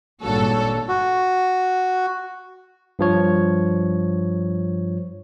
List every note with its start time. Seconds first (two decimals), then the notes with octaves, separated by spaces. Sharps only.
0.22 G#1 G2 A#2 F#4 A4 C#5
0.88 F#4
2.99 G2 F3 C#5